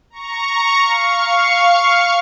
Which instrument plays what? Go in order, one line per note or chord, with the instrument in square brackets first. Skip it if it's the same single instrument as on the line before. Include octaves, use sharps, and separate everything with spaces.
[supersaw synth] A#5 C#6
F5 C#6